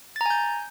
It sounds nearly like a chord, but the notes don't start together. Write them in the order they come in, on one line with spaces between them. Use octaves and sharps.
A6 A#5 G#5 G6